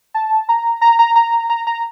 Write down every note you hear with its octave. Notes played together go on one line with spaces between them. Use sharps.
A5
A#5
A#5
A#5
A#5
A#5
A#5